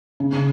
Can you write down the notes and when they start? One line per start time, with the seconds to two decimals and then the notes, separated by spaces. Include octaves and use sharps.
0.20 C#3
0.33 C#3